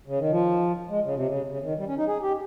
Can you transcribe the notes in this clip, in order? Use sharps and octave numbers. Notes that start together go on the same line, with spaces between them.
C#3
D#3
F3
G#3
C#3
C3
C#3
C#3
D#3
G3
C#4
D#4
G#4
G4